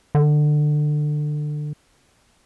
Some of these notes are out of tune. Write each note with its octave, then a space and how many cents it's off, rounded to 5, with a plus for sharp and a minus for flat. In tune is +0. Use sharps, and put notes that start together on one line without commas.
D3 +25